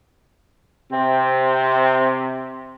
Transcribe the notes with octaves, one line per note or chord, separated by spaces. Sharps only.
C3 C4